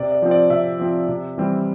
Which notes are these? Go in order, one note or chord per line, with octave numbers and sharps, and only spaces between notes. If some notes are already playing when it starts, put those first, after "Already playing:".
Already playing: C3 D5
D5
F3 C4
D5
C3 E5
F3 C4
C3
E3 G3 C4